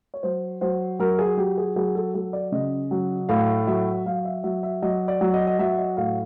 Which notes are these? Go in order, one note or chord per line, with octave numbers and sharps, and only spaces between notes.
C#5
F#3 C5
F#3 C5
F#3 A#4
G#4
F#3 G4
G#4
F#3 G#4
A4
F#3 A4
D5
C#3 D#5
F#3
A2 F5
F#3 E5
F#3 F5
E5
F#3 E5
E5
F#3 D#5
D5
F#3
D#5
D#5
F#3 E5
D#5
A2 F5